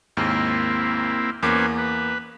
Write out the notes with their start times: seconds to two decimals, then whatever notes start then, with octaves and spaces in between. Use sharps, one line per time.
0.17 D#2 G#2 A#3 C4 E4
1.43 E2 A#3 C#4 B4 C5 D6
1.78 B4